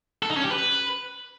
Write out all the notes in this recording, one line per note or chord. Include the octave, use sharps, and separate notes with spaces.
A4
D#4
C#4
G4
B4